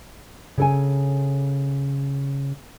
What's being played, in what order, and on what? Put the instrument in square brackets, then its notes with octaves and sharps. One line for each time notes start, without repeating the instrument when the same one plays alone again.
[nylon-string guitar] C#3 A4 G#5